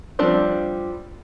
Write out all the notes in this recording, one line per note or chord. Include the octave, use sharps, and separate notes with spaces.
F3 G3 C4 D4 F4